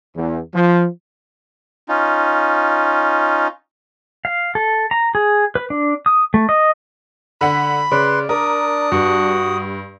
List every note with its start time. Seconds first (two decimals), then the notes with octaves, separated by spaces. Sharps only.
0.15 E2
0.54 F3
1.89 C#4 D#4 F4
4.25 F5
4.55 A4
4.91 A#5
5.15 G#4
5.55 B4
5.70 D4
6.06 D#6
6.34 A3
6.49 D#5
7.41 D3 F#5 B5 B6
7.91 C#3 B4 D5 C6
8.29 D4 A#4 D5 D#6
8.92 G2 F#4